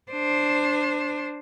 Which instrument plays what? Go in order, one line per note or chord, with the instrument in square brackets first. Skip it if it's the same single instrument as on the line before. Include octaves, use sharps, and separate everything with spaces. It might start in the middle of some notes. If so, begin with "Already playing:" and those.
[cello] D4 C5